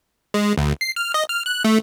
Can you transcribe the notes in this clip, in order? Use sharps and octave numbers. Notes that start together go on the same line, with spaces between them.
G#3
D2
C7
F6
D#5
F6
F#6
A3